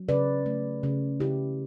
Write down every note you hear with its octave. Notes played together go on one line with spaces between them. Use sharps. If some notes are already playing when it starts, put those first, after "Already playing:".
Already playing: F#3
C#3 B4 D5
A3
C#3
C#3 E4 G4